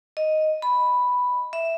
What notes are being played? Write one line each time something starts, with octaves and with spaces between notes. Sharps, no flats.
D#5
B5
E5